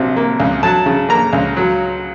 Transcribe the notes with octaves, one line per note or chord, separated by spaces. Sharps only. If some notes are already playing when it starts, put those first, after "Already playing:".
Already playing: A#1 C3 F#3
A#3
C#2
F#3 A5
C#3
A#3 A#5
C#2
F#3